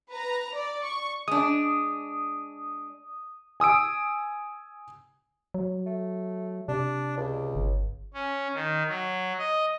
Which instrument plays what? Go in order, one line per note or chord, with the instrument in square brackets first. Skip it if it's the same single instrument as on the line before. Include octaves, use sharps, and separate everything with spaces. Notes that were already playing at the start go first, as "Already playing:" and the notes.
[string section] B4 A#5
D5
C#6
[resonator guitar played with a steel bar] G#3 D4 [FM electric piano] D#6
[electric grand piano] G#5 D#6 E6 D7
[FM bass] F#3
[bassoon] A3
[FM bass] C3 [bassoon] D4
[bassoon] C#2
[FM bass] G1
[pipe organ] C#4
D#3
F#3
D#5